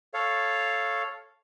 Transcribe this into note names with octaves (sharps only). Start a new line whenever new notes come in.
A4 C#5 F5